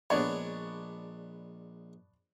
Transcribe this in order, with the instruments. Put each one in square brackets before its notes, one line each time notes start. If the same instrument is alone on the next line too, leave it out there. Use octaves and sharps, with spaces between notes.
[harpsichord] A#1 G#3 [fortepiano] B3 D4 C#5